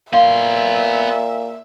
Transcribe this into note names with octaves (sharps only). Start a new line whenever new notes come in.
A#2 B3 E5 F5 C6